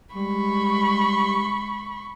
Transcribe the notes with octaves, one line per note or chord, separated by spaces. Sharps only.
G3 G#3 B5 C#6